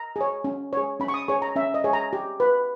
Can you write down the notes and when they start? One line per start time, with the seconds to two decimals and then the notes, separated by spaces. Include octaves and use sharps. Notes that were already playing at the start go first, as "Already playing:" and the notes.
Already playing: A#5
0.16 G#4 C#5
0.44 C#4
0.73 G#4 C#5
1.00 C#4 B5
1.08 C#6
1.14 D#6
1.28 G#4 C#5 C#6
1.42 A#5
1.56 C#4 E5
1.74 D#5
1.84 G#4 C#5
1.93 A#5
2.13 G4
2.40 B4